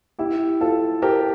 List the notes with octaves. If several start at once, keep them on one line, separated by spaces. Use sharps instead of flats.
E4 G4
F4 A4
G4 A#4